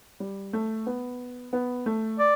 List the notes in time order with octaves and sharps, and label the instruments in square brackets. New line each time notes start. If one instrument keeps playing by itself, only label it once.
[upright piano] G3
A3
B3
B3
A3
[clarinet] D5